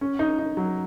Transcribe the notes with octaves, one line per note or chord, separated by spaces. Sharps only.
C#4
D#4
D#4
F#3